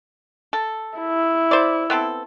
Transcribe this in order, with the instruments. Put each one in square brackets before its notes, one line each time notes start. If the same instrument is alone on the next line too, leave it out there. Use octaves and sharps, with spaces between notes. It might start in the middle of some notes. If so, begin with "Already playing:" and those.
[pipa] A4
[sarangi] E4
[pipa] C5 D5
B3 C4 A4